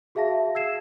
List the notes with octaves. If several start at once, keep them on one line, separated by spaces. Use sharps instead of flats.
F#4 G#4 E5 F5 A5 A#6
E6 G#6 C7 E7